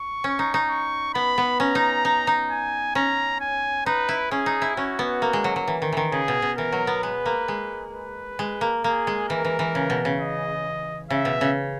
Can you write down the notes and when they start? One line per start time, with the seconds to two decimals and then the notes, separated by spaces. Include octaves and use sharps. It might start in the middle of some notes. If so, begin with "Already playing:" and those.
Already playing: C#6
0.24 C#4
0.39 D#4
0.54 D#4
0.69 C#6
1.14 B3 B5
1.38 B3
1.60 C#4 A#5
1.75 D#4
2.05 D#4
2.27 D#4
2.51 G#5
2.95 C#4 A#5
3.41 G#5
3.86 D#4 B4
4.09 E4
4.31 C#4 G#4
4.46 D#4
4.62 E4
4.76 C#4 F#4
4.99 B3
5.22 A#3
5.33 G#3
5.44 F#3
5.56 F#3
5.68 E3
5.82 D#3
5.92 D#3 E3
6.12 C#3 G#4
6.28 B2
6.42 B2
6.58 E3 A#4
6.72 F#3
6.87 B3
7.03 G#3 B4
7.26 A#3
7.48 G#3
7.93 B4
8.39 G#3
8.61 A#3
8.84 A#3 G#4
9.07 G#3
9.29 E3 A#4
9.44 E3
9.59 E3
9.75 C#3
9.90 B2
10.05 C#3
10.20 D#5
11.10 C#3 E5
11.25 B2
11.41 C#3